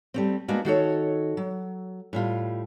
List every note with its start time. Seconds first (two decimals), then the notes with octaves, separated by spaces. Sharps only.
0.14 G3 A3 C4
0.48 G#3 A#3 B3 D4 F#4
0.65 D#3 F#4 A4 C#5
1.37 F#3
2.13 A2 G3 F4